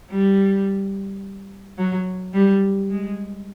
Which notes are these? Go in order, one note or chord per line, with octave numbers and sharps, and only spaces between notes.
G3
F#3
G3
G#3